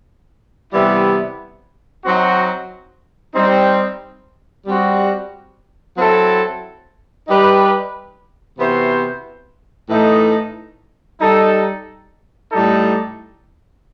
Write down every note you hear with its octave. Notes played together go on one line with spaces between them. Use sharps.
C3 E3 G3 B3 E4
F#3 C4 D#4 F#4
G3 C4 D#4
G3 C4 F#4
F#3 C4 E4 A4
G3 D#4 G4 B4
C3 E3 B3 F#4 C5
A2 E3 A3 D#4 A4
G3 D#4 A4
A2 G3 D#4 A4